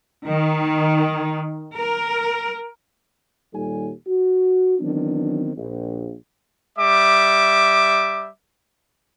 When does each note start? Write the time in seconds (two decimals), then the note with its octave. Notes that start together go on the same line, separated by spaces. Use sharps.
0.27 D#3
1.74 A#4
3.53 D#2 A#2 G3 D#4 A4 G#5
4.07 F#4
4.80 D#3 E3 F#3 B3 C4 D4
5.56 A#1
6.78 G3 E5 D6